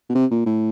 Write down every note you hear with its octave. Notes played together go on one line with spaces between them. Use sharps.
B2
C3
A#2
A2